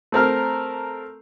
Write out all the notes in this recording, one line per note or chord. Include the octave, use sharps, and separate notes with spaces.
A3 C4 A#4 F6